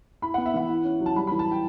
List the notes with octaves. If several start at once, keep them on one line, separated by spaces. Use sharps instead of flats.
E4 B5
F#5
B3
E5
E3 F#5
E4
C#4
F#3
A5
G3 B5
B5
E3
A5
G5